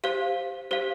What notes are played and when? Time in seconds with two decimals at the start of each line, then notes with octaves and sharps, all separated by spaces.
0.04 G4 C5 F5
0.71 G4 C5 F5